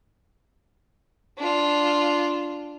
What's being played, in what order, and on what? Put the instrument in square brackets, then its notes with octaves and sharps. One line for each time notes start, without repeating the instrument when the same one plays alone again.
[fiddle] D4 F4